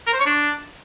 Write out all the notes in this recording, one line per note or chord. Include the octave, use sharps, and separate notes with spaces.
A#4
C5
C#5
D4